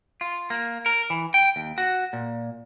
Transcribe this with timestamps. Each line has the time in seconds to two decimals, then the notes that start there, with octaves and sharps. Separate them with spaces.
0.21 F4
0.50 A#3
0.86 A#4
1.10 E3
1.34 G5
1.56 D#2
1.78 F#4
2.13 A#2